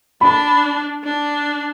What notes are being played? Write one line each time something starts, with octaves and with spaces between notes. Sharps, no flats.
D4 B5
D4